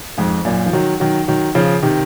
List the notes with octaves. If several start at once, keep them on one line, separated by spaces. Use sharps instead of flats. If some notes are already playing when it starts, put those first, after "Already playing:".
F2 G#2
F#2 A#2
F3
D#3 F#3
D#3 F#3
D#3 F#3
C#3 F3
C3 D#3